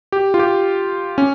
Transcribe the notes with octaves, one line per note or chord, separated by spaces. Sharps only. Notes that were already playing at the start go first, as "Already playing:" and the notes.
G4
F4
G4
C#4